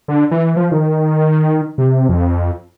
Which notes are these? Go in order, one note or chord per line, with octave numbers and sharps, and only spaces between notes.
D3
E3
F3
D#3
C3
F2